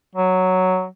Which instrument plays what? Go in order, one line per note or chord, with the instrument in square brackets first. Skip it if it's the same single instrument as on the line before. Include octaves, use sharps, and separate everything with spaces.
[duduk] F#3